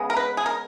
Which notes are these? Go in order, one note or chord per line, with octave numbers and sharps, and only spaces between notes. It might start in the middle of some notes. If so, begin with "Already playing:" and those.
Already playing: C#3 G#3 B3
A#4
B4
G#4
A#4